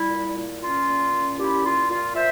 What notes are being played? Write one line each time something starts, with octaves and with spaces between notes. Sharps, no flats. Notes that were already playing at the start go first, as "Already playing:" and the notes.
Already playing: G3 E4
A#2
A#2
C#4 F4
A#2
C#4
A#2 E4 G4
A#2 F4
A#2 F4
F3 C5 E5